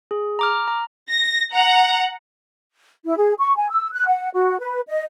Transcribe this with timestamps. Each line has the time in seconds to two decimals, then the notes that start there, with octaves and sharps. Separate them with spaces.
0.11 G#4
0.39 A#5 D6 F6
0.68 A#5
1.09 A#6
1.52 F#5 A#5
3.04 E4
3.16 G#4
3.38 C#6
3.56 G#5
3.70 E6
3.92 F#6
4.06 F#5
4.33 F#4
4.59 B4
4.88 D#5